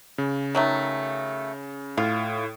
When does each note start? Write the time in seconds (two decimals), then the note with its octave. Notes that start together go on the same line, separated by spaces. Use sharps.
0.18 C#3
0.55 D#3 F#3 A3
1.97 A2 F4